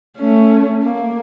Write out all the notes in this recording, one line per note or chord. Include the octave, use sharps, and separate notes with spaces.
A3 C#4
A#3